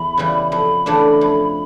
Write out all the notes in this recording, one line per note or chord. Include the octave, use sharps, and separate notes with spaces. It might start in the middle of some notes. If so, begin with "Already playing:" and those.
Already playing: E2 B5
C#3 E3 G3
F2 B5
C#3 E3 A3 D4
F2